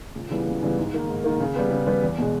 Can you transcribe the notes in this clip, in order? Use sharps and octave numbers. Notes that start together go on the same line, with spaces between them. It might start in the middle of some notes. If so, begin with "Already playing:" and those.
C#2
C#3 E3 G3 B3
C#2
C#3 E3 G3 B3
G#2
D#3 A#3
G#2
D#3 A#3
C#3
G3 B3
C#3
G3 B3
E2
B2 G#3